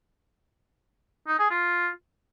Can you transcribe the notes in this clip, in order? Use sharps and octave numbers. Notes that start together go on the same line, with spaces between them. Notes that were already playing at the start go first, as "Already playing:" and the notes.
D#4
G#4
F4